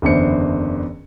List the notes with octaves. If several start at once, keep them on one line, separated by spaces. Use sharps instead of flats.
F#1 E2 D3 D4 C5 C#7